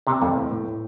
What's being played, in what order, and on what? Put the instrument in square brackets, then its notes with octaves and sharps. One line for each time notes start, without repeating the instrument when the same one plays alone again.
[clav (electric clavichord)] C3 [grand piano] C4
[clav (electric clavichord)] F2 [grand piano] A3
[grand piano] A2
A2
A2